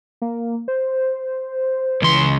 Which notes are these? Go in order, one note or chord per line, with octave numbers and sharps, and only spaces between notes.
A#3
C5
C#2 E3 C6